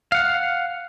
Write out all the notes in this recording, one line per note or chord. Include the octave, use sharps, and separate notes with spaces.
F5 F#5